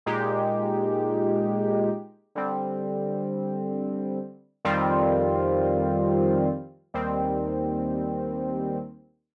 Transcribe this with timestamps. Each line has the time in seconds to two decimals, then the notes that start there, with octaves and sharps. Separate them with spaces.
0.06 A#2 G#3 D#4 G4
2.35 D3 G3 C4
4.65 F2 D#3 G3 C4 F4
6.94 D#2 D#3 G3 C4